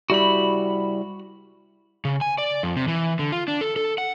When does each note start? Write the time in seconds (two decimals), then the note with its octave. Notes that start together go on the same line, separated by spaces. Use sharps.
0.10 G3 E4 F#4 B5
2.05 C#3
2.21 G#5
2.38 D5
2.63 F2
2.77 C3
2.88 E3
3.19 D3
3.32 F4
3.48 D4
3.61 A4
3.76 A4
3.98 F#5